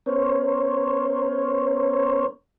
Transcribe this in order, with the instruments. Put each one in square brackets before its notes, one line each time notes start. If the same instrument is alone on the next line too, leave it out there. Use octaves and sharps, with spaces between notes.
[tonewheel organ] B3 C#4 A#4 C5 C#5